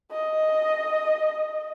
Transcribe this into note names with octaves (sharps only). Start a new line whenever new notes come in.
D#5